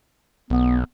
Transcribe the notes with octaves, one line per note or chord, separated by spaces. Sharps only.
B1 B3